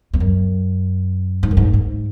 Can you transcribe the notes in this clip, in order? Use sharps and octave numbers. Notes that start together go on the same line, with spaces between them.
E2
F#2
G#2
F#2
G#2
G#2